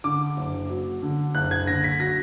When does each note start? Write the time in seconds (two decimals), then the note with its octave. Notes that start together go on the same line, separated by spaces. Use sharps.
0.04 D3 D6
0.37 F#1
0.70 F#3
1.02 D3
1.35 F#1 F#6
1.51 G#6
1.67 D3 A#6
1.84 B6
2.00 F#3 A#6